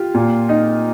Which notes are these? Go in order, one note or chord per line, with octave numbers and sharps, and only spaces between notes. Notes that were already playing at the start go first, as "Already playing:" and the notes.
Already playing: F4 G4
A#2
D#4